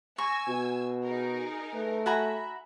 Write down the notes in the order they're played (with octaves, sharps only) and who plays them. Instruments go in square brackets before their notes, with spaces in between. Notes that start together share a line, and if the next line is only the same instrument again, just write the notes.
[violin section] G#5 E6 G#6 [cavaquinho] C#6 [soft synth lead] A#6
[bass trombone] B2 [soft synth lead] F#4
[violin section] D#4 G#4 A#4
[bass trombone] A3 [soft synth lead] B4
[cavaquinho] F#4 G#5 A#5 [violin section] E5 [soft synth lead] B5